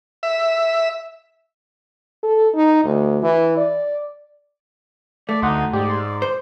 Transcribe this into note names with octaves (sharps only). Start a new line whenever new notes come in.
E5
A4
D#4
D2
E3
D5
A3 D5
D2 D#4 F#5 C6
G#2 G4 D5
C6
C5